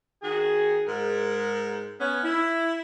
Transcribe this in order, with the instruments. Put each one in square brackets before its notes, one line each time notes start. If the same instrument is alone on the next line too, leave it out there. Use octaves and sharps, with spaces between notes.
[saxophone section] D#3 F#4 G#4
G#2 A#4
B3 C#4
E4